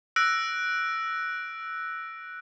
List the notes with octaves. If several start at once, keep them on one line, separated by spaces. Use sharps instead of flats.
E6 F#6 A#6 D7